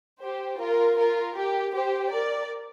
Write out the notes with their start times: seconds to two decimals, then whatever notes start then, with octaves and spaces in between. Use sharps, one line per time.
0.22 G4 C5
0.60 F4 A#4
0.98 F4 A#4
1.36 G4
1.74 G4 C5
2.11 A#4 D5